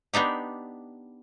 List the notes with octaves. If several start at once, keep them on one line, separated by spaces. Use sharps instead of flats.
B3 D4 D#4 G4